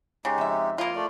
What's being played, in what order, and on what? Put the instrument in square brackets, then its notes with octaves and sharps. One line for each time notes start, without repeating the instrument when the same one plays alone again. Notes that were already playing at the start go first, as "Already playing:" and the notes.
[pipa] C#3 [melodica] G#3 D#4 G4
[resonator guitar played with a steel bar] F2 E5
[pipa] A#3 F4 [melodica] E4
[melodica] A3 D5